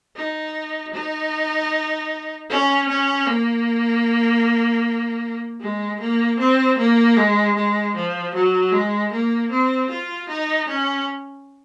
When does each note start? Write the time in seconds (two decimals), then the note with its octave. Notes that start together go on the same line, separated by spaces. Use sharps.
0.16 D#4
0.94 D#4
2.50 C#4
2.89 C#4
3.27 A#3
5.61 G#3
6.00 A#3
6.39 C4
6.78 A#3
7.17 G#3
7.56 G#3
7.96 F3
8.35 F#3
8.72 G#3
9.12 A#3
9.51 C4
9.90 F4
10.29 D#4
10.68 C#4